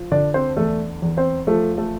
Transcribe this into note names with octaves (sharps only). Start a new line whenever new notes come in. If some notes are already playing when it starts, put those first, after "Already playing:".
Already playing: F3
D3 D4 D5
C4 C5
E2 A3 A4
E2
C4 C5
F3 A3 A4
A3 A4